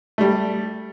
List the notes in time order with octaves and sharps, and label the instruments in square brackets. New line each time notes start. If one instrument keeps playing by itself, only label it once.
[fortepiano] G3 A3